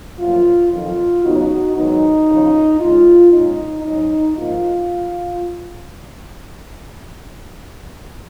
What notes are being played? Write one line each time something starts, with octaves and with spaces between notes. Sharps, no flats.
F#2 F3 A#3 F4
F2 D#3 F#3 F4
D#2 C#3 F#3 B3 D#4 F#4
G#2 D#3 F#3 B3 D#4
D#2 C#3 F3
C#3 G#3 D#4 F4
A#2 G#3 C#4 D#4
G#2 F#3 C#4 D#4
G#2 F3 A#3 D#4 F4